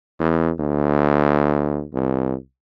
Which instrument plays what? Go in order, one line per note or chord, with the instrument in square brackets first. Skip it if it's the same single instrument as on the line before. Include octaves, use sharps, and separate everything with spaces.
[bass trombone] E2
D2
C2